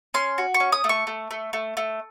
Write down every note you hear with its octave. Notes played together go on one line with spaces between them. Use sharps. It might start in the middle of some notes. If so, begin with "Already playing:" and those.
C#4 C6
F#4
C#6
C#4
D#6
A3
C#6
A3
A3
A3
A3